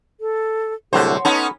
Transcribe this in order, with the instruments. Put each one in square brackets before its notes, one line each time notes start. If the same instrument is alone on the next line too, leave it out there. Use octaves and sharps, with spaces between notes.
[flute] A4
[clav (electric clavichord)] C2 A2 D3 [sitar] F#3 C5 [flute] G#4
[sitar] B3 C#4 D#4 [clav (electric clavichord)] A4 [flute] B5